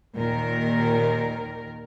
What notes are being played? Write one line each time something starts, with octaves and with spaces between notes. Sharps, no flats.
D#2 A#2 D#3 A#4